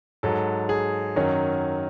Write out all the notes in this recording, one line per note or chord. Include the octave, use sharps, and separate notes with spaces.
G#2 F#3 A4
G#4
F#2 D#3 F#3 C#4